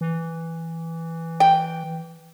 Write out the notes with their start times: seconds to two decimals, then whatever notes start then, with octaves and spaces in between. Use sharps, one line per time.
0.01 E3
1.40 G5